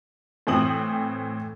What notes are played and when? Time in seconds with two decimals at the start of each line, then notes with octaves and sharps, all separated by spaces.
0.47 A2 E3 C4 D#6 F#7